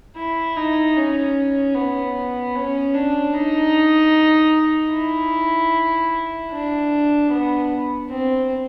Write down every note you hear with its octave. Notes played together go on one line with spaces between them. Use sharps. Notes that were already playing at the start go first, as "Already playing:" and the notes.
E4
D#4
C#4
B3
C#4
D4
D#4
E4
D4
B3
C4